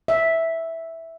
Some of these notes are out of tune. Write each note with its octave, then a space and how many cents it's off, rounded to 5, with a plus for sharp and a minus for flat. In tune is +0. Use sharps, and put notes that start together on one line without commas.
E5 -5